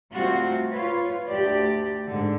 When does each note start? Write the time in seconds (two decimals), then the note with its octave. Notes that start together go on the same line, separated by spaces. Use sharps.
0.13 C3 G3 A3 C4 F4 F#4
0.71 F4 B4 C#5
1.27 D2 G4 D5
2.07 G#2 D3